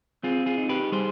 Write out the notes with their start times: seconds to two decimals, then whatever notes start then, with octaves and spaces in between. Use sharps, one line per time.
0.23 C4 F4 G#4
0.46 F4 G#4
0.58 D#4
0.69 G4 B4
0.92 G3 G#4 C5